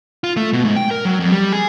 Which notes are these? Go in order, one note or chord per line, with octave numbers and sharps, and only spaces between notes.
F4
A3
B2
G#2
G5
A#4
F#3
F2
G3
G#4